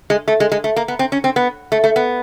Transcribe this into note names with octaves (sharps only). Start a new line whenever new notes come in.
G#3
A3
G#3
G#3
A3
A#3
B3
C4
C#4
C4
B3
A3
A3
B3